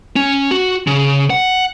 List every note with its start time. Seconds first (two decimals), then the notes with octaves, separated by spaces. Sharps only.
0.16 C#4
0.51 F#4
0.87 C#3
1.30 F#5